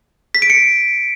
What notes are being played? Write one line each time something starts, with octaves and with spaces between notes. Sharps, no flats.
B6
D7
C#7